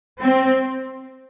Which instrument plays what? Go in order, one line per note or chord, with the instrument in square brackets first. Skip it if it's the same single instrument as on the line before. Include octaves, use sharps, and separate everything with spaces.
[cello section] C4